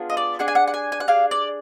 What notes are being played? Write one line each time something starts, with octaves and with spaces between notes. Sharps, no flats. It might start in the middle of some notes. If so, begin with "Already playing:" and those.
Already playing: B3 D4 F4 G#4
D#5
D5
D4 G#4 F#5
G#5
F#5
F#5
G#5
G#5
F#5
D4 G#4 F5
D5